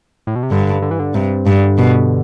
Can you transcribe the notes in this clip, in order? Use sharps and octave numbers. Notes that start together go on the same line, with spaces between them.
A2
B2
C3
G2 D3
D3
E3
D3
G2 C3
G2 D3
B2